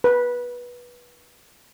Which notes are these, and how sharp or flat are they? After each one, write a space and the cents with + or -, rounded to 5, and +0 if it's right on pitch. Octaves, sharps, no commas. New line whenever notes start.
B4 -20